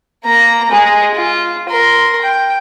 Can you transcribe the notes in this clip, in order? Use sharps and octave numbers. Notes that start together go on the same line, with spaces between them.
A#3 A#5
G#3 G#4
F4
A#4 C6
G5